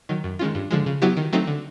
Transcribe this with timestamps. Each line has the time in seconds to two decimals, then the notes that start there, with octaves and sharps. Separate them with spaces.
0.09 D#3 F#3
0.24 F#2
0.39 D#3 G#3 C#4 F4
0.55 G2
0.71 D3 F3 G#3
0.86 C#3
1.02 F#3 B3 E4 G4
1.17 D#3
1.33 F#3 A3 C4 D#4
1.47 D3